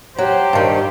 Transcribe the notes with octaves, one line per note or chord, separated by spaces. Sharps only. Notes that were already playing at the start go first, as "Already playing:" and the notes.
F#3 G4 C5
G2 D#3